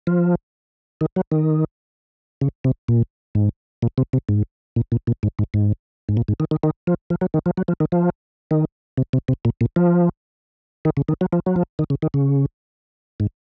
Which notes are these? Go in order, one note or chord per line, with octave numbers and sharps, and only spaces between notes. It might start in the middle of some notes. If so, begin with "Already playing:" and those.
F3
D#3
F#3
D#3
C#3
C3
A#2
G#2
A#2
C3
C3
G#2
A#2
A#2
A#2
G#2
G#2
G#2
G#2
A#2
G#2
D#3
D#3
D#3
F3
F3
F#3
D#3
F3
F#3
F3
D#3
F3
D#3
C3
C3
C3
A#2
A#2
F3
D#3
C#3
D#3
F#3
F3
F#3
F3
D#3
C#3
D#3
C#3
G#2